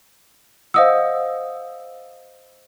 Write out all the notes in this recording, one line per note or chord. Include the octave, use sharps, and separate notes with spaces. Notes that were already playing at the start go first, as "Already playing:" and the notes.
C5 D#5 F5 F#5 D#6 E6